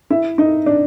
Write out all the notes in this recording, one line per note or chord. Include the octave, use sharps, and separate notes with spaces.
E4 E5
D#4 D#5
D4 D5